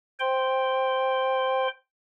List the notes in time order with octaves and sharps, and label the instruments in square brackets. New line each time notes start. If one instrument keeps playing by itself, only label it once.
[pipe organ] C5 G5 C6